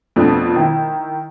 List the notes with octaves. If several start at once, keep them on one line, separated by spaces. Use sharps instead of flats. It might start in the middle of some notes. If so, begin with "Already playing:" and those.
F2 B2 A3 D4 F4
D#3 E4